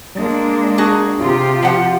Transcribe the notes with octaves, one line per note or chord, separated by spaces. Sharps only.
G#3 A#3 D4
D#4 F#4 G#4
C3 F4 G4
F3 F#5